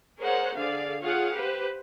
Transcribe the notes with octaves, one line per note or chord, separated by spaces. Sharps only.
G#4 A#4 C5 C#5 F#5
D3 G#4 D5 F5
F4 G#4 C#5 F5 F#5
G4 B4 C5